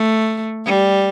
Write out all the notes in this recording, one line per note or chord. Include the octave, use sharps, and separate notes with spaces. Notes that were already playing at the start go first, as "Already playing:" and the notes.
Already playing: A3
G3